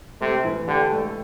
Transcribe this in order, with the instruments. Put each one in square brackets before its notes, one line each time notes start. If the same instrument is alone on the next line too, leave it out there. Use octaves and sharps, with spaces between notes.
[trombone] C3 [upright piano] A3
[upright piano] E3
[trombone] D3 [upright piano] G4
[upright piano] A3